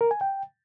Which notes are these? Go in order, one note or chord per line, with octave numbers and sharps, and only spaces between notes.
A#4
G#5
G5